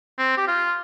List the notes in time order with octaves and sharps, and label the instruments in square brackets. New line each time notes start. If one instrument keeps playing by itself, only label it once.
[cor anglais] C4
G4
F4